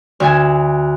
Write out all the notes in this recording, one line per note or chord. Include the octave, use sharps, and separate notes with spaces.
D2 E5 G#5